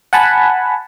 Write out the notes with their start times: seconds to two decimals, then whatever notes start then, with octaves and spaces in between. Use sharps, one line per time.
0.13 F#5 G#5 A5 B5